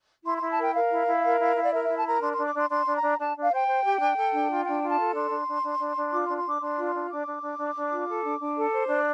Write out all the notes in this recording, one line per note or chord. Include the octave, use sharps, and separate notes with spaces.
E4 C6
C6
E4
A5
A#4 G5
A#4 F5
E4
E4
A#4
E4
E4
D5
A#4 E5
E5
E4
A5
A#4 A#5
D4 C6
D4 C6
D6
D4 C6
D4 C6
D4
A#5
D4
D4 A5
D4
F5
C5 G5
C5
G4
D4
A4
D4
F4
D4 G5
F4
A5
A4
D4 C6
D4
D4
D4
D4
D4
F4 D6
C6
D4
C6
D4 D6
D4 C6
F4
C6
D4
D4 D6
D4
D4
D4
D4
F4
A4
D4
D4
A4
C5
D4